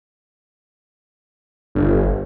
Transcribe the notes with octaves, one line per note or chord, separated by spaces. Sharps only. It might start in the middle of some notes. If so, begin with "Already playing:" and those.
G1